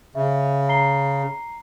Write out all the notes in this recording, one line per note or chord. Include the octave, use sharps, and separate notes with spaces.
C#3 E5
A#5 C7 G7